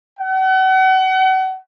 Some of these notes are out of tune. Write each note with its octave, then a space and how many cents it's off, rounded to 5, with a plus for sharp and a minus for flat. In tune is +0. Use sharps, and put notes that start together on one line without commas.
F#5 +35